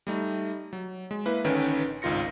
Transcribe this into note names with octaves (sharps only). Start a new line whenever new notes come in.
G3 A3 D#4
F#3
G#3
A#3 E4 B4
A1 D3 D#3 C#4 B4 D7
G#1 C#2 D#3 F4 A#6 C#7